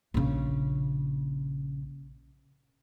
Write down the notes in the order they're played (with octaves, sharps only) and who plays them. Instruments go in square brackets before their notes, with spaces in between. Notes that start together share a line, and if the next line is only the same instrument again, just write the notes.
[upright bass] A#1 C#3